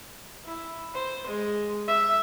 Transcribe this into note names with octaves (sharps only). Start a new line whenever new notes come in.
E4
C5
G#3
E5